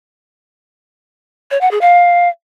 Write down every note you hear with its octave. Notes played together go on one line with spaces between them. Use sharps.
C#5
F#5
G#4
F5